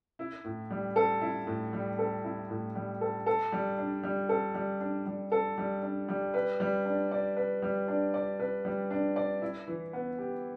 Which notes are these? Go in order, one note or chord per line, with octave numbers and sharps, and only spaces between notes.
E4
A2
G3
A4
E4
A2
G3
A4
E4
A2
G3
A4
A4
G3
D4
G3
A4
G3
D4
G3
A4
G3
D4
G3
B4
G3
D4
D5
B4
G3
D4
D5
B4
G3
D4
D5
E4
E3
B3
G4